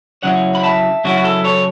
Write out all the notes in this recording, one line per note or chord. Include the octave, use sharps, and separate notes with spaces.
F#2 C#3 F#3 C#4 E4 C#5 F#5
B5
E5 A5
F#2 C#3 F#3 C#4 E4 F#4
F#4
A4
A4 C#5